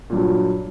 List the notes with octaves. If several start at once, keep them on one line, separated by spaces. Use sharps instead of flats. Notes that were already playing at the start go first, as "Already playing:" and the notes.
G2 A#2 F#3